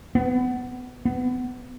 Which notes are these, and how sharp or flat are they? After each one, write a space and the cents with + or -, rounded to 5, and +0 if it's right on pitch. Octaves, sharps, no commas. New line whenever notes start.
B3 +15
B3 +20